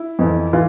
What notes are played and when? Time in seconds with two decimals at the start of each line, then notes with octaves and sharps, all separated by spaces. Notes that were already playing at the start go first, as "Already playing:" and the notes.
Already playing: E4
0.19 F2 E3
0.53 E3 F4